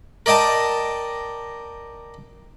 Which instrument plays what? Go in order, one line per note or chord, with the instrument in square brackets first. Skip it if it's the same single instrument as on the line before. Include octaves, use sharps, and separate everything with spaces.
[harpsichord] A#4 D5 D#5 G5 A5